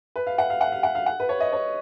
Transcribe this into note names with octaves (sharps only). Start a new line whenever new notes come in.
B4
F5
F#5
F5
F#5
F5
F#5
F5
F#5
B4
C#5
D#5
C#5